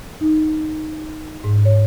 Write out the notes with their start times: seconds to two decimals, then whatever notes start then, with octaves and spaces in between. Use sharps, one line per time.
0.21 D#4
1.44 G#2
1.65 C#5